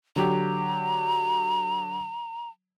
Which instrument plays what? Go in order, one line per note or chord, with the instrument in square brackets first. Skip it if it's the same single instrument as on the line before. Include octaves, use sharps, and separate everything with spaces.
[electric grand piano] D3 F#3 G4 [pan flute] A#5